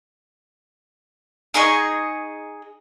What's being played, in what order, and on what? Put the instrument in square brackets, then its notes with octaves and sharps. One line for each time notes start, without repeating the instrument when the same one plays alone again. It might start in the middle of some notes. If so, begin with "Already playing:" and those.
[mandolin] D#4 G#4 D#5 C#6